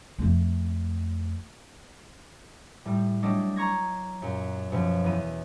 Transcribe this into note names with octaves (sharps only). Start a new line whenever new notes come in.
F2 A3
A2 G3
F#3 G3 A3 D4 D5 D#5
A#5 C#6 G#6 A#6
F#2 A#2
F#2 B2 F3
E2 B5 D#7